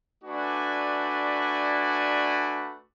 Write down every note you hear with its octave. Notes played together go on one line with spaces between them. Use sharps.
A3 D4 F#4 B4 D5 G#5